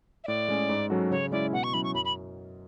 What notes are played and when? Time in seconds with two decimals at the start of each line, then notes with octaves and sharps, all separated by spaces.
0.24 E5
0.27 A2 D5
0.48 G#3 C#4 G#4
0.69 G#2
0.90 F#3 C#4 F#4 A4
1.11 C#3 C#5
1.32 G#3 C#4 E4 D5
1.52 B2 F#5
1.64 C#6
1.73 F#3 C#4 E4 B5
1.84 C#6
1.94 F#2 B5
2.05 B5